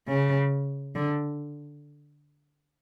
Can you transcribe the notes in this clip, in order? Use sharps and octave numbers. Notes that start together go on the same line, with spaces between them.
C#3
D3